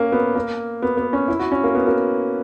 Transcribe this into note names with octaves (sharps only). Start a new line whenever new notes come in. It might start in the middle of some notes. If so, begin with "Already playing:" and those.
Already playing: A#3 C#4
B3
A#3
B3
B3
C#4
E4
F#4
C#4
A#3
B3
A#3